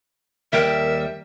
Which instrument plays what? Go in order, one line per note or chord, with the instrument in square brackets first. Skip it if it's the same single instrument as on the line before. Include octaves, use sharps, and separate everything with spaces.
[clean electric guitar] D#2 G3 G5 [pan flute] A#4 [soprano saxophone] E5